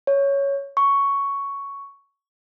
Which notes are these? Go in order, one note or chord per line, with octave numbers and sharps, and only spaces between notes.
C#5
C#6